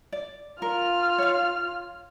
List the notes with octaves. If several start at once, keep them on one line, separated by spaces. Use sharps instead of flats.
D5
F4 A#4 F6
C#5 F5